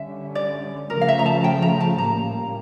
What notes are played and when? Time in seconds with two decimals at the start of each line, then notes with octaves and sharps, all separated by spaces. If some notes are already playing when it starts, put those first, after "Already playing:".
Already playing: D3 G3 C#4 E5
0.35 D5
0.90 C#3 F3 A3 C#4 A#4
1.01 F5
1.08 E5
1.19 A#5
1.26 A5
1.44 G5
1.62 A#5
1.80 A5
1.98 A2 G3 A#3 A#5